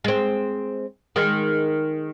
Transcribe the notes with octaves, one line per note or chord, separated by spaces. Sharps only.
G#3 C4
D#3 G#3